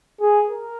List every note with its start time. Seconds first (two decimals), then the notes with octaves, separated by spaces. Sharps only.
0.21 G#4
0.49 A#4